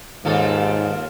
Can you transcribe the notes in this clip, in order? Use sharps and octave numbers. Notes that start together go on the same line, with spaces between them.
D#2 G#2 F4 A4